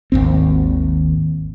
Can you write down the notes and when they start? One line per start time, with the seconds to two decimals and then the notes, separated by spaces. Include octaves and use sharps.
0.12 G#1 D#2 C4